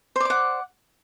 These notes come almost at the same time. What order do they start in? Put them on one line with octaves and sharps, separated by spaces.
C5 D5 D6 F#5